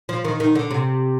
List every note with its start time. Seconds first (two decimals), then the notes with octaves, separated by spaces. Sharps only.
0.09 F3
0.25 D#3
0.40 D#3
0.55 D3
0.71 C3